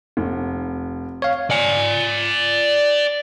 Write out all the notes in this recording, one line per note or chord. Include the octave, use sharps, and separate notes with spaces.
F1
C#5 F5
D5 G#5